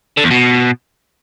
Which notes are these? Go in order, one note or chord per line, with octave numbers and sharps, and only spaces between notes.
D3
E2
B2